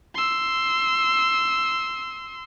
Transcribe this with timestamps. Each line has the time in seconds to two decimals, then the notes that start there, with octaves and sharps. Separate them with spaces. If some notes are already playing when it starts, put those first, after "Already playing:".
0.15 C6 E6